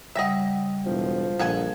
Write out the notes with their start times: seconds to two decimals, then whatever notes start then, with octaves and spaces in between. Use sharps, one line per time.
0.15 C#3 G3 D#5 E5 F#5
0.86 E1 F3
1.39 A#1 A4 F5 F#5 G#5